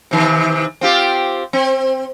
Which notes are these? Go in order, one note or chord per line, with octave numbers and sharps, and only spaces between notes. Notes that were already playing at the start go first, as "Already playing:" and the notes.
C3 D#3 E3
C4 F4 G4
C4